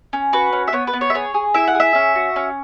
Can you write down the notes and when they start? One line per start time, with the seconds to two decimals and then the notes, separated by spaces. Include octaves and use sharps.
0.13 C#4
0.33 F#4 B4
0.53 C#4
0.68 E5
0.73 B3 C#5
0.87 B4
0.93 B3
1.01 C#5
1.10 E5
1.14 G#4 C#5
1.34 G#4
1.54 E4 E5
1.68 F#5
1.75 G#4
1.80 E5
1.95 C#4
2.15 F#4
2.36 C#4